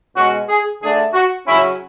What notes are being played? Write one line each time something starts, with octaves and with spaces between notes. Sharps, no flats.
B2 G#3 C#4 F#4
G#4
D3 A3 D4 G#4
F#4
C#3 F#3 C#4 E4